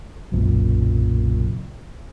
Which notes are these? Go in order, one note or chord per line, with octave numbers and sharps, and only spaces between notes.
F#1 B1 F#2 A#2